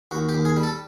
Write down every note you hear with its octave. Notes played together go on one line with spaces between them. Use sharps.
D#2 F#4
G4
D#2
G#4
G3
A4